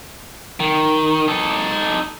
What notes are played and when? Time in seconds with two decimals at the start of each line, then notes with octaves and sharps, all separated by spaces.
0.60 D#3
1.28 D#4 A4